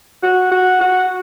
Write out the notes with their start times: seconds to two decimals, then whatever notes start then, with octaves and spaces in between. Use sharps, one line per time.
0.23 F#4
0.52 F#4
0.81 F#4